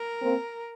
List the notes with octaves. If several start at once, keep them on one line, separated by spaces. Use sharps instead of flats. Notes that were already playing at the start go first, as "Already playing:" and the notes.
Already playing: A#4
A#3 C4